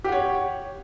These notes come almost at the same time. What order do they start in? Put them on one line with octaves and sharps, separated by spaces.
G4 F#5 C#5